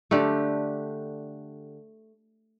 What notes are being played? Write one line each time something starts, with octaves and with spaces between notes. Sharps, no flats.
D3 A3 D4 G4